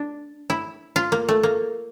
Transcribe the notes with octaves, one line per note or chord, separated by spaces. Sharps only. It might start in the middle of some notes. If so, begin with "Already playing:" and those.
Already playing: D4
E4
F4
A#3
A3
A#3